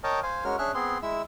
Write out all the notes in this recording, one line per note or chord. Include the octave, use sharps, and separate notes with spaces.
A#4 C#5 D#5 G5 A5
C5 F5 G#5
G#3 C#4 F#4 A#4 F6
C#4 D4 G#4 E5 F6 F#6
B3 C4 G#4 C6
G#3 E4 E5 E6